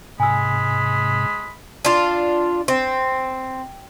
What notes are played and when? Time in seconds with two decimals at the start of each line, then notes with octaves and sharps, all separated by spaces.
0.20 G#2 C3 G#3 G#5 B5 E6
1.85 D4 F4
2.68 C4